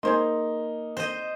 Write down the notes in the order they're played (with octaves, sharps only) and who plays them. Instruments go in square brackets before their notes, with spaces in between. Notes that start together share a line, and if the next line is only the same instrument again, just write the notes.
[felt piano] A#3 [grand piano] D#4 [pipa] G#4 C5 C6
[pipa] C4 [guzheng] C5 D#5